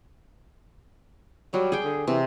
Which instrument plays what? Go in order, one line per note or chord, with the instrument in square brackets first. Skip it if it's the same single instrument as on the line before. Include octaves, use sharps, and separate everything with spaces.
[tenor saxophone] F#3 [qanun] G3
[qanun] G#4 G5
[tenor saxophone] D3
[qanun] C3 [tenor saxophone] E3